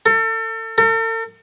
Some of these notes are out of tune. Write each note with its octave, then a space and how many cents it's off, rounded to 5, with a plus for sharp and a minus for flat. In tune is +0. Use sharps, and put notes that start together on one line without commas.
A4 +35
A4 +45